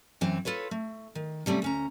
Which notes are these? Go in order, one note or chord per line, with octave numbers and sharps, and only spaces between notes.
F#2 E3 C4
F4 A4 B4 C#5
A3
D#3
C3 G3 A3 C#4
D2 C#4 A#5